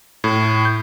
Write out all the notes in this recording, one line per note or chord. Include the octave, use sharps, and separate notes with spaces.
A2
G6